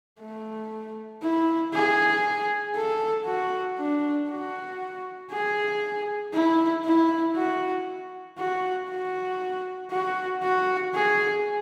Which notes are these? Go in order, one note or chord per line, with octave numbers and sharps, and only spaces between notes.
A3
E4
G#4
A4
F#4
D4
F#4
G#4
E4
E4
F#4
F#4
F#4
F#4
F#4
G#4